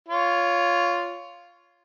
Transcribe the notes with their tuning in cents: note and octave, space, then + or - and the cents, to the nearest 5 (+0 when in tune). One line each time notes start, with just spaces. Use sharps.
F4 +0 C#5 +15